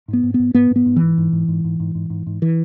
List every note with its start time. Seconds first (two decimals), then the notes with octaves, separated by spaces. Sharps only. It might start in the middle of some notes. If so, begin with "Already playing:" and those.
0.08 G#2
0.13 B3
0.23 G#2
0.34 B3
0.39 G#2
0.54 G#2 B3
0.71 G#2
0.76 B3
0.86 G#2
0.96 E3
1.02 G#2
1.18 G#2
1.32 G#2
1.48 G#2
1.64 G#2
1.80 G#2
1.95 G#2
2.10 G#2
2.27 G#2
2.42 E3